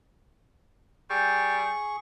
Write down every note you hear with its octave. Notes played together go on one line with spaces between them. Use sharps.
G3 G#4 C#6